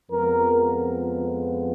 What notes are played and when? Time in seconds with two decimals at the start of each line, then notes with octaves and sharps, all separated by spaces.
0.11 F2 F3 G#3 B3 A#4